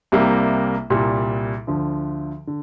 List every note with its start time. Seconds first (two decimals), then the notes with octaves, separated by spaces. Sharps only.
0.12 C2 C3 G3 A#3
0.90 C2 A#2 G3
1.67 D2 D3 F3
2.47 D3